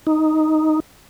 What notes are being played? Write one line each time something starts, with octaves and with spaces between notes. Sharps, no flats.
D#4